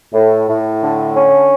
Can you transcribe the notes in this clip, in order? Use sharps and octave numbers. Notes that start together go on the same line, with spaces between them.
A2
A2
D3
C#4